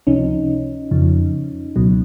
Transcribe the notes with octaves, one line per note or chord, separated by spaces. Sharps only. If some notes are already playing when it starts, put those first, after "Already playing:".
C#2 C3 F3 C#4 D#4
F2 C#3 F3
C#2 B2 F#3